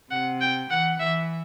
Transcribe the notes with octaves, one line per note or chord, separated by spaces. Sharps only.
C3 F#5
G5
E3 F#5
E3 E5